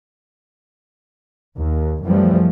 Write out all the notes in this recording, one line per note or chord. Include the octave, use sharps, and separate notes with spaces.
D#2
F#2 E3 F3 G3 A3